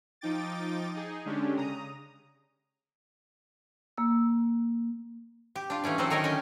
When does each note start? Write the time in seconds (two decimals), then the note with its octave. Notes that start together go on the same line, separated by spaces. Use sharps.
0.21 F3 D#4 G5 D6 A6
0.95 D#4 G#4
1.25 D3 G#3 C#4 D4 G4
1.57 C#3 A#5 D#6
3.98 A#3 E6
5.56 G4
5.70 D4 F4
5.84 E3 A3 C#4 D4
5.98 F#3 A3 C4 A4 C5
6.10 D#3 D#4 A#4 C#5 D#5
6.23 D3 C#4 D#5 G5